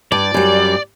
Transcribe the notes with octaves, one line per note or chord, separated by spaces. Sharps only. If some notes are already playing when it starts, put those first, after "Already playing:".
G2 D5
F#2 G3